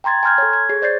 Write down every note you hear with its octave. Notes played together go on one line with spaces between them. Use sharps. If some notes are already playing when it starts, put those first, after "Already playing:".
G5 A#5 C6 G#6 A6
G#5 A#5 C6 F6 G6 G#6
A4 C#5
G#6
G#4 C#5 C7
C5 D5 G6 A6 C7